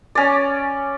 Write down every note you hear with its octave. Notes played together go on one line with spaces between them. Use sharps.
C#4 D5